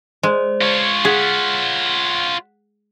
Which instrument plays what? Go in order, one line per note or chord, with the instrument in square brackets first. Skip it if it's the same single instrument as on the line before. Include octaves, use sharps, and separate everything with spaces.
[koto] G#3 [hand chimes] C5 D5
[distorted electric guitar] F4 C#5
[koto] G#4 [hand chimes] F#5 F#6 B6